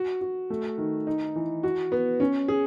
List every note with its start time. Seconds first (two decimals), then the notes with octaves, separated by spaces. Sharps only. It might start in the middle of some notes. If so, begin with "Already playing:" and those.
Already playing: F#4
0.21 F#4
0.50 A3
0.78 D#3
1.07 D#4
1.36 E3
1.63 F#4
1.92 B3
2.20 C#4
2.48 G#4